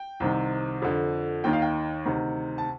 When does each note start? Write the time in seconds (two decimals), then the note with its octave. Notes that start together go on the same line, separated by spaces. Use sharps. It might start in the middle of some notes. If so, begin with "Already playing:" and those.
Already playing: G5
0.20 C2 C3 D#3
0.82 F2 D3
1.44 D#2 D#3 G5
1.53 F5
1.62 G5
2.06 D2 C3 D#3
2.58 A5